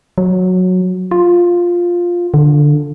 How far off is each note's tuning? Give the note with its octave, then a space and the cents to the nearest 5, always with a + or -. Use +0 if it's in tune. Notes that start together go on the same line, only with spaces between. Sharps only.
F#3 -10
F4 +5
D3 +5